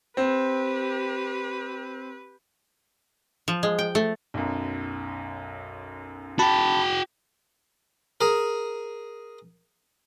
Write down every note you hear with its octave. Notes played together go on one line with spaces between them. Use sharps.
C4 G4 B4
F3
G#3
G5
A3
B1 F#2
F#4 G5 A5 B5
G#4 A#4